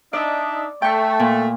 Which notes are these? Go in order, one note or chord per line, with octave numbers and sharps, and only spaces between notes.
D4 D#4 D5 E5
A3 G5 C#6
A#2